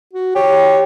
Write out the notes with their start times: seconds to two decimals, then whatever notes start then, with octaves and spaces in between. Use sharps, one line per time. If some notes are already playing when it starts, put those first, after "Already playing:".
0.13 F#4
0.35 G4 C#5